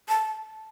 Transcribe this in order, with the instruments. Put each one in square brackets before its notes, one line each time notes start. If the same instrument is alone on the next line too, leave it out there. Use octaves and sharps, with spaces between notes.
[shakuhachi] A5